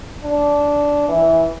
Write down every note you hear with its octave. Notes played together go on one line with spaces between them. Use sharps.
D4
E3